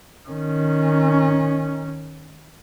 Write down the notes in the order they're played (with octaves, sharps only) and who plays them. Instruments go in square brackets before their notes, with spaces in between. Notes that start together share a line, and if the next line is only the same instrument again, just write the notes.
[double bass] D#3 C#4